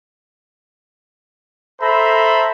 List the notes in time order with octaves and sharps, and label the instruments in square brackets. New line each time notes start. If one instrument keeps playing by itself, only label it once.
[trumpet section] A4 C5 E5 A#5 B5